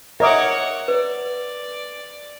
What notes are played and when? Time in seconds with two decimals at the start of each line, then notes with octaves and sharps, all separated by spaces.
0.20 A#4 C#5 D#5 E5 F#5 D6
0.88 B4 D5